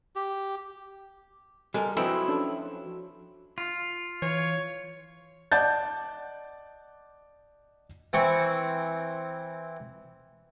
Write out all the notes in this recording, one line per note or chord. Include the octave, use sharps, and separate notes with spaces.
G4
G3 G#3 A4 A#4
F3 F#3 C4 E4 A4 B4 D#5
C#4 D4 A4
F4
E3 C#5
D5 D#5 F#5 A5 G6 A6
E3 C4 C#6